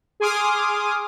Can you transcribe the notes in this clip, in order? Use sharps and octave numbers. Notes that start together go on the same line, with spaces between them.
G#4 G#5 C6 D6 D#6 F6